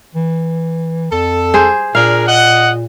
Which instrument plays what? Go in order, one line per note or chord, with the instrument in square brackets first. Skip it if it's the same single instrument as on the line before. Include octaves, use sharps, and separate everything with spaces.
[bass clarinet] E3
[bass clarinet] F2 [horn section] A4
[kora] G#4 C5
[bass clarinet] A#2 [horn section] D4 G#4 A#4 [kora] F5
[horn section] D#5 F#5